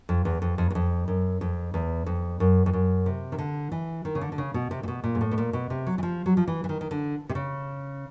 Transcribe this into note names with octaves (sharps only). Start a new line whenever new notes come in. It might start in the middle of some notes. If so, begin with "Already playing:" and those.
F2
E2
F2
F2
E2
F2
F#2
F2
E2
F2
F#2
F2
F#2
C3
D#3
D3
E3
D#3
C#3
D3
D3
C#3
B2
C3
A#2
B2
A#2
G#2
A2
B2
A#2
B2
C3
F#3
E3
F3
F#3
F3
E3
E3
D#3
D#3
D3
C3
C#3